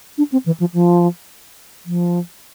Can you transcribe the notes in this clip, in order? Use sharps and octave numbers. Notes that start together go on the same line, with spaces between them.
D4
C4
E3
F3
F3
F3